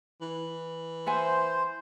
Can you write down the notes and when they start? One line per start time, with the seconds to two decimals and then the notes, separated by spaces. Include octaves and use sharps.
0.21 E3
1.06 C5 E5 F#5 G#5